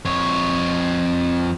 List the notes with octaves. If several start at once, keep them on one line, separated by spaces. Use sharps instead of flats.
F2 C#5